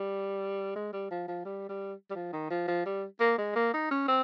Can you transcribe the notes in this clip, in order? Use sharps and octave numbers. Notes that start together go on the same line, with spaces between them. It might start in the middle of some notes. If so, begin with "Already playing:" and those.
Already playing: G3
G#3
G3
F3
F3
G3
G3
G3
F3
D#3
F3
F3
G3
A#3
G#3
A#3
D#4
C#4
C4